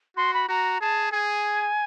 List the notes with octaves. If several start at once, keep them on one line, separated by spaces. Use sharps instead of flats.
F#4 C6
B5
F#4 A#5
G#4 A5
G#4 G#5